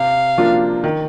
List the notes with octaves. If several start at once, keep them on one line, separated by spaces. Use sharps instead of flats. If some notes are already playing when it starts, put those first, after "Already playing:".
Already playing: C3 F5
F3 A#3 D4 F4
D#3